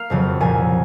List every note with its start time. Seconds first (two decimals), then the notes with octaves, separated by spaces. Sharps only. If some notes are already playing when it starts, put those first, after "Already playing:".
Already playing: A#3 F5
0.10 F#1 F2 C#3 F#3
0.41 C2 A#2 F3 G#5